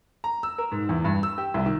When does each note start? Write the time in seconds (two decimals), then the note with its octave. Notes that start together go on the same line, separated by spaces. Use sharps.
0.24 A#5
0.43 E6
0.58 A#4
0.72 G#2
0.89 E2
1.04 G2
1.23 E6
1.38 G4
1.54 C2
1.66 D#3